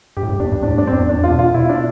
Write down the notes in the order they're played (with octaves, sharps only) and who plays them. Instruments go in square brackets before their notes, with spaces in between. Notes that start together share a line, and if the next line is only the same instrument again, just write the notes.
[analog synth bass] G2 [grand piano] G4
[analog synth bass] A2
G2
[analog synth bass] E2 [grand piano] D4
[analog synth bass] G2
[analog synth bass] A2 [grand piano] D4
[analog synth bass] G2 [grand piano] D4
[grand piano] C4
[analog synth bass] F2 [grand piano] D4
[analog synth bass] E2 [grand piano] D4
[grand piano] F4
[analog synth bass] B2
[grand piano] F4
[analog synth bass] B2 [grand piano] E4
[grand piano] D4